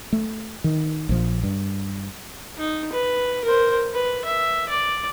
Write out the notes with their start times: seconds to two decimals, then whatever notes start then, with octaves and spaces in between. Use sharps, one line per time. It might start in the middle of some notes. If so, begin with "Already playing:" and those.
0.12 A3
0.64 D#3
1.09 A#1 F3
1.43 G2
2.57 D#4
2.93 B4
3.44 A#4 C5
3.94 B4
4.25 E5
4.69 D5